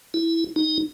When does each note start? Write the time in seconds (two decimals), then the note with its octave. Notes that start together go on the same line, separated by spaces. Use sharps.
0.14 E4
0.56 D#4